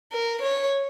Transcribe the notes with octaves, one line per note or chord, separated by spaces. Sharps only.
A#4
C#5